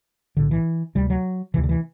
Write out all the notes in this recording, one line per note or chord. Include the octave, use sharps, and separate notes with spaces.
B1 A2 D3
E3
D2 C3 G3
F#3
D2 C3 E3
D3
E3